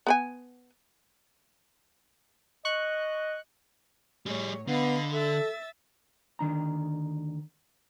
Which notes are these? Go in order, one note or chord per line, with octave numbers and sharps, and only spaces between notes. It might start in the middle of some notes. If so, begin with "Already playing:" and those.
B3 B4 G#5
D#5 C#6 F#6
A2 G3 G#4 C#5
D3 B3 D#5 F5 B5
A4 E5 E6 A6
D2 D#3 D4 A#5